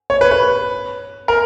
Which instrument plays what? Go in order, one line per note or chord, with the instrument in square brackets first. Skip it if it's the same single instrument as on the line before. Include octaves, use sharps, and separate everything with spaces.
[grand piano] C#5
B4
B4
A#4